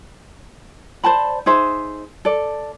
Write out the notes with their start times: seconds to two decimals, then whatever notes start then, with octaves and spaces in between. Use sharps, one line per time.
1.04 C5 D5 A5 B5
1.46 D#4 G#4 C5 E5
2.25 A4 D5